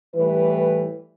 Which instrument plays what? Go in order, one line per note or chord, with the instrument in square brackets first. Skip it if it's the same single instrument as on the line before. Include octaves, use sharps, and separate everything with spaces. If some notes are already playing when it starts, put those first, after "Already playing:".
[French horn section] A2 E3 G3 B4